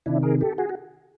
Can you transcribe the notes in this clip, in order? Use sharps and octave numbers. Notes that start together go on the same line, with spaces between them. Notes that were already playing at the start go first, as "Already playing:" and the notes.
C3 D#3 D4 E4
G#4 A#4
G4 A4
F#4 G#4
F#4